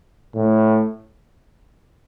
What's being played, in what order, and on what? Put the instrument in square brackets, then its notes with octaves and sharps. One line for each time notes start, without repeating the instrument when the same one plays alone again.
[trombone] A2